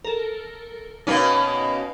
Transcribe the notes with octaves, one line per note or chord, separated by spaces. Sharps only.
A4 A#4
B2 A#3 C#4 D#4 B4 F5